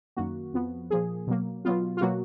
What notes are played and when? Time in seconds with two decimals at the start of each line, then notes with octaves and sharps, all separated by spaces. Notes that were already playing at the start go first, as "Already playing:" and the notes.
0.17 F#2 D#3 A#3 F#4
0.53 F2 F3 B3
0.91 A#2 F3 A#3 G#4
1.27 B2 F#3 A#3
1.65 B2 F#3 B3 F4
1.97 F4
2.01 B2 F#3 A#3 F#4